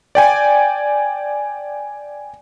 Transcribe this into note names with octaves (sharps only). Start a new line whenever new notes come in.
D5 G5 G#5